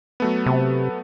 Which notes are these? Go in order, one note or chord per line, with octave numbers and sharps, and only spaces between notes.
F#3 A3 B3
C3